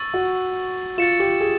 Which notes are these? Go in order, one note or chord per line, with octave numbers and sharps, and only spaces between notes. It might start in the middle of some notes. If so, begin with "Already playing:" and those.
Already playing: C#6 E6 A6
F#4
F4 A6 C#7 E7
G4
G#4